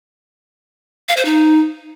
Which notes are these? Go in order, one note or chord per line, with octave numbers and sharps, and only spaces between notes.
F5
C5
D#4